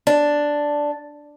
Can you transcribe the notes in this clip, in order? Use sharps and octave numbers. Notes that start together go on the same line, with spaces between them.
D4